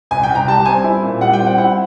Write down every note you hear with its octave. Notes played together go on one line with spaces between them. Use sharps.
C2 G#5
G5
C2
A#5
G3 A5
C4 G#5
E4
A#2
G3 F#5
G5
C4
F#5
E4 F#5